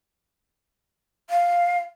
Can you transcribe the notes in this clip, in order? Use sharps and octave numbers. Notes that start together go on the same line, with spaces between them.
F5